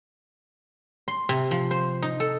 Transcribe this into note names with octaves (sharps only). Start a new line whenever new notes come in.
C6
C3
F3
C5
D#4
A4